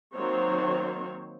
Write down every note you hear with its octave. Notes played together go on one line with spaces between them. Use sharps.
D#3 F#3 A#3 C4 C5 C#5